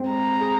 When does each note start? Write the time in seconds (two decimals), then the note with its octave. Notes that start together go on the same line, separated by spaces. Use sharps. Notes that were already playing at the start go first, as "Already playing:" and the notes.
Already playing: G#3 C4
0.08 A#5
0.41 G#4